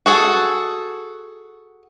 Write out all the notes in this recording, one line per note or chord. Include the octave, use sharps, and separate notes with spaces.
F#4 G#4 A4